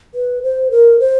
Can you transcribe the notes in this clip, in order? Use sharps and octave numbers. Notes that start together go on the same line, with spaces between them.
B4
C5
A#4
C5